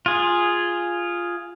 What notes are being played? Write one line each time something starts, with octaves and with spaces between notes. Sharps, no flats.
F4 G#4